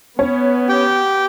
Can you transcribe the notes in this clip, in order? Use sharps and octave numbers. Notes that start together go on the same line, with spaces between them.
B3 C#4
G4 G5